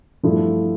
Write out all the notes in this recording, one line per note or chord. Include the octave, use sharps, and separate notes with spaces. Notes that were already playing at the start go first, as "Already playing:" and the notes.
G2 F3 A3 E4